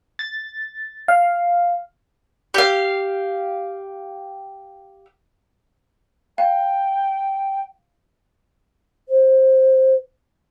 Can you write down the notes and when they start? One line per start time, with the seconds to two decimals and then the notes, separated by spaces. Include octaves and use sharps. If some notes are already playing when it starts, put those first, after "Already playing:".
0.19 A6
1.08 F5
2.54 G4 F5
6.38 F5 G5
9.09 C5